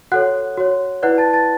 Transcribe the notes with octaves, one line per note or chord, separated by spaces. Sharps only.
F#4 A4 C#5 F#5 F#6
F#4 C#5
E4 B4 D5 F#5 F#6
A5 A6
A5 A6